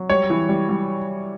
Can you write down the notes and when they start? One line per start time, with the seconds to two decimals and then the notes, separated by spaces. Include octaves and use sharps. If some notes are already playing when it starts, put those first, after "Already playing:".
Already playing: F#3
0.09 G3 C#5
0.30 E3
0.49 G3
0.69 G3